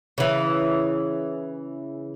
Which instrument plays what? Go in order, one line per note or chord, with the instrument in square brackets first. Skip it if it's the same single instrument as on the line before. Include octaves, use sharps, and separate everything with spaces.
[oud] C#3 E3